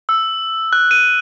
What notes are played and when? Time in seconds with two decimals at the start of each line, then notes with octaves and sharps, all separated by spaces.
0.09 E6
0.73 F#6
0.91 D#7